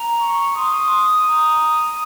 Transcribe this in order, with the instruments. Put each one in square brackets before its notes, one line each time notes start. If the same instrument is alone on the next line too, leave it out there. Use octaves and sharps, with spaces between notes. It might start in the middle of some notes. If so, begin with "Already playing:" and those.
Already playing: [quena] A#5
[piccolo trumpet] C#6
[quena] C6 [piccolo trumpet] D#6
[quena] A#5